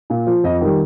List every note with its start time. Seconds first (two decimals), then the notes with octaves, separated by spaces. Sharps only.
0.10 A#2
0.27 F3
0.44 F2 D#5
0.61 D#3 G3